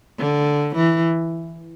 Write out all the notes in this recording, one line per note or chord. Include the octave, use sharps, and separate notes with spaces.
D3
E3